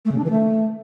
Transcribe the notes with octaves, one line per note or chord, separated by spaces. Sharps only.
A3
C#3
D4
E3
A3